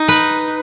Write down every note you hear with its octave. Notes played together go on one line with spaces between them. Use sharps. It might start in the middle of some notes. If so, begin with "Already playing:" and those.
Already playing: D#4
B4